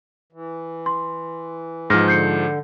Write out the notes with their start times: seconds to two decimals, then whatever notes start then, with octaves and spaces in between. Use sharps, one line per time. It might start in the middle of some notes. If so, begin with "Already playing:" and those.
0.33 E3
0.86 C6
1.90 G#2 F3 F6 A#6
2.08 D3 G6 C7 C#7